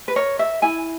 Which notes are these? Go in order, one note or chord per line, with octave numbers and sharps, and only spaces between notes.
B4
A#4 C#5
E5
E4 G#5